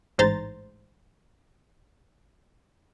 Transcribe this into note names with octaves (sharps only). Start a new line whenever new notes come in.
A1 G#2 C5 A#5 A6